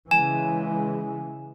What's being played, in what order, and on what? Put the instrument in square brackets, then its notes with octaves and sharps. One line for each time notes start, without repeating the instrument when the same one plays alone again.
[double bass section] C#3 E3 G#3 [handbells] G#5 [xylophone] E7